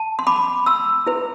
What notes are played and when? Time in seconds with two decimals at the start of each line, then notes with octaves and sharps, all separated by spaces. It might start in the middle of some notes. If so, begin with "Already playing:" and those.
Already playing: A5
0.19 C6
0.27 B5 D6
0.66 C6 E6
1.07 E4 B4